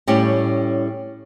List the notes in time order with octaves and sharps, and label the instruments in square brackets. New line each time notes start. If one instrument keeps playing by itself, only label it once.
[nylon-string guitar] A2 G3 C#4 G4 C#5